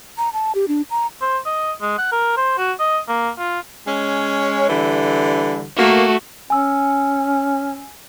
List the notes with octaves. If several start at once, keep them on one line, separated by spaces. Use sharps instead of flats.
A#5
A5
G4
D4
A#5
C5
D#5
G#3
F#5
A#4
C5
F#4
D#5
A#3
F4
G#3 C#4
D3 E3 G3
A3 A#3 F#4
C#4 G#5 E6